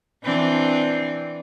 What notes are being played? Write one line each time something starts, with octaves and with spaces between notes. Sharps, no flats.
E3 C4 D4